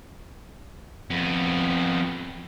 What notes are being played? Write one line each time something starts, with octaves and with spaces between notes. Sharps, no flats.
F2 B3